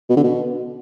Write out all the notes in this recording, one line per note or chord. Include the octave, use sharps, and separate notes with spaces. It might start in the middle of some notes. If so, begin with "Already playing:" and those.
B2
D3
B2